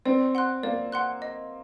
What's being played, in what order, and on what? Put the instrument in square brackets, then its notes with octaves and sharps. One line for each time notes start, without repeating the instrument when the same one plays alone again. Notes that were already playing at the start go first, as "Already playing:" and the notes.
[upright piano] C4 [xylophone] D5
[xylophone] F#5 C6 F#6
[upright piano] A#3 [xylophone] D5
[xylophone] F#5 C6 F#6
D#5